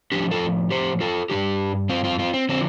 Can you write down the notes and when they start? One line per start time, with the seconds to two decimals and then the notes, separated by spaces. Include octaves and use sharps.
0.12 A2 F3 D4 G4
0.31 F4 A4
0.71 G4 C5
1.01 F4 A4
1.30 G2 F3 D4 G4
1.89 C4 F4
2.04 C4 F4
2.19 C4 F4
2.34 C4
2.49 D3 F3 C4